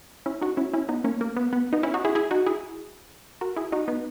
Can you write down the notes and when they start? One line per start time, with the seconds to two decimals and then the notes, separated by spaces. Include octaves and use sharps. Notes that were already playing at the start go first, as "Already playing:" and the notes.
0.26 C#4 E4
0.41 D#4 F#4
0.57 C#4 E4
0.74 C#4 E4
0.89 B3 D#4
1.04 A#3 C#4
1.21 A#3
1.37 B3
1.53 B3
1.73 B3 D#4
1.83 C#4 E4
1.94 D#4 F#4
2.05 E4 G#4
2.15 E4 G#4
2.31 D#4 F#4
2.46 E4 G#4
3.41 F#4 A#4
3.57 E4 G#4
3.72 D#4 F#4
3.88 B3 D#4